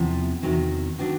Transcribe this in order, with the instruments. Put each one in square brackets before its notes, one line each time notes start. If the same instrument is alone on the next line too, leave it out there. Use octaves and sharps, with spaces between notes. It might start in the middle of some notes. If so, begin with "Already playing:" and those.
Already playing: [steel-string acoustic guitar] E2 C3 F3
E2 C3 D#3 F#3
D#3 F#3 B3 D4